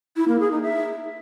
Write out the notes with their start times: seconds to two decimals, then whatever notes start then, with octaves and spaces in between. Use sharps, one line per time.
0.17 E4
0.28 A#3
0.40 G#4
0.51 D#4
0.63 E5